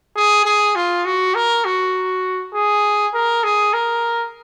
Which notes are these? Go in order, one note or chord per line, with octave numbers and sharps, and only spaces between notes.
G#4
G#4
F4
F#4
A#4
F#4
G#4
A#4
G#4
A#4